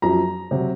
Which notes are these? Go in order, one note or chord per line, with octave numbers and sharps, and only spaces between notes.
F#2 F3 A#5
C3 F#3